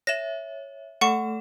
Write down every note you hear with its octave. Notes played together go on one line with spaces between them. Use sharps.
C#5 E5 A#6 E7
A3 A4 F#5 C#6 E7